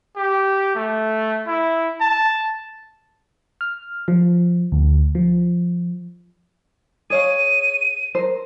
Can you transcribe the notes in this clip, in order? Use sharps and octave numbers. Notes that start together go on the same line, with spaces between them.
G4
A3
E4
A5
F6
F3
D2
F3
G#4 C#5 F5 D#7
A#4 C5